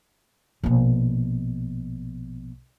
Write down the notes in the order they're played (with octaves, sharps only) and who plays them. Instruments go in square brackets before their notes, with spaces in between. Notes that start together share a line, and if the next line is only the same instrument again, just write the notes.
[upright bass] A#1 B2